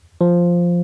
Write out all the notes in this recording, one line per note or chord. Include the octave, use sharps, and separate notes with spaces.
F3